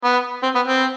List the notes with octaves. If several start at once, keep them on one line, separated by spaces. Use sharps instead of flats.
B3
C4
B3
C4